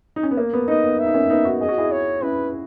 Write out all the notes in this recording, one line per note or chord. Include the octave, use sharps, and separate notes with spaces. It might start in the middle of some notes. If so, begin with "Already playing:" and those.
D#4
C#4
B3
A#3
B3
B3 D#4 D#5
B3
E5
D#4
A#3 C#4
B3 D#4
D#4 F#4
G#4 D#5
F#4
E4 G#4
C#5
C#4 E4 B4